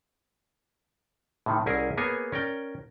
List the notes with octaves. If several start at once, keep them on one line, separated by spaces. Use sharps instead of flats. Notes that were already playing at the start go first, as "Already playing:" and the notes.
A2 C3 D#3
C2 C#4 E4 G#4 A#4
A#3 B3 G#4 C#5 G#5
C#4 A#4 D5 G5